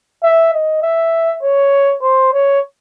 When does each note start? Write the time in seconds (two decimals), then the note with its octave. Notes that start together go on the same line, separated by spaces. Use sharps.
0.23 E5
0.54 D#5
0.83 E5
1.43 C#5
2.02 C5
2.33 C#5